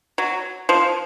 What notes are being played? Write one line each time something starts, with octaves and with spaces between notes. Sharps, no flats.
F#3
F3